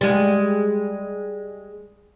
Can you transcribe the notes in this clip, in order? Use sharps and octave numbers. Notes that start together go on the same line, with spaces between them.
G3 G#3